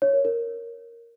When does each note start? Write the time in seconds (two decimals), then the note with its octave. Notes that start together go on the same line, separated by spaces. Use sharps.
0.02 C#5
0.13 A#4
0.25 A#4